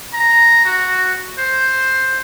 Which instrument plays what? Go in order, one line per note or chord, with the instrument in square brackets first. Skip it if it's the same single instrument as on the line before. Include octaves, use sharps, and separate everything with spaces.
[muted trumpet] A#5
F#4
C5